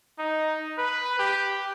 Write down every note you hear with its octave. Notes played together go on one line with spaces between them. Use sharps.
D#4
B4
G4